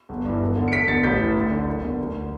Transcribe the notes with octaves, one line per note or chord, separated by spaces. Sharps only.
G1
G2 E3
E1
E2 D3
C#7
E1 B6 D7
E2 D3 A6 C#7
A1 G6 B6
A2 E3
D2
D3
F#1
E2 D3
D2
D3